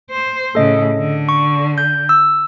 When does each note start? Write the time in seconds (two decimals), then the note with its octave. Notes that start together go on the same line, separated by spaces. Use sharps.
0.11 C5
0.55 A2 C#3 A4 D#5
0.99 D3
1.29 C#6
1.78 G6
2.09 E6